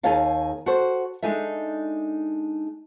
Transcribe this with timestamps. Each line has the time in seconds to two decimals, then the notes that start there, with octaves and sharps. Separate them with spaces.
0.03 D#2 D#4 G#4 C#5 F5 A5
0.66 F#4 A4 C5
1.22 G#3 D4 D#4 A4 E5